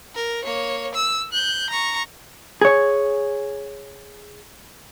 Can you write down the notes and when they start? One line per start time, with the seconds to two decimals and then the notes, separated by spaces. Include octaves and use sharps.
0.15 A#4
0.44 A#3 C#5
0.95 E6
1.32 F#6 G6
1.70 A#5 C#6
2.61 G#4 C#5